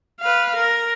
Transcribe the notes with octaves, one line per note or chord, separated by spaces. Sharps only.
B4 F5
A#4